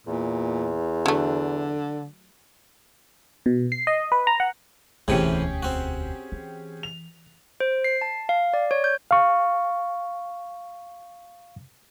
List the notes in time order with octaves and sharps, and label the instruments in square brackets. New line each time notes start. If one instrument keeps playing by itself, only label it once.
[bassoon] E2 [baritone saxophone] A#2
[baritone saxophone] D3 [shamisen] F#3 A3
[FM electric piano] B2
C7
D#5
B4
A#5
F#5
[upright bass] E1 D2 [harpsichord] A2 C3 E3 [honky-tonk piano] C#4 G4 G#4
[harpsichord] C4 F#4
[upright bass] E3
[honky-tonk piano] F7
[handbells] C5
C7
A5
F5
D5
C#5
G6
[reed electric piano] F5 C#6